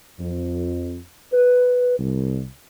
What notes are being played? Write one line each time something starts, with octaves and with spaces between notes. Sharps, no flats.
F2
B4
C2